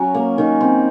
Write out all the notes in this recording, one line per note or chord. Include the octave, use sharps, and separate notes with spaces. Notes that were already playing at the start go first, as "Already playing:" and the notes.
Already playing: F#3 C#4
A#3
D#3
C4